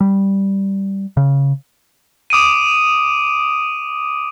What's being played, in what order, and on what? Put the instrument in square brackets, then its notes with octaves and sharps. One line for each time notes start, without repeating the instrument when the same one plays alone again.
[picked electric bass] G3
C#3
[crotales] D6 D#6 D7 D#7